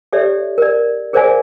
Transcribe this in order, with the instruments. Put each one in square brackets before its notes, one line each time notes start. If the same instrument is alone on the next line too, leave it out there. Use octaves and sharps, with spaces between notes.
[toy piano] G4 A4 C#5 D5 E5
A#4 D5
G#4 A#4 C5 D5 F5 G#5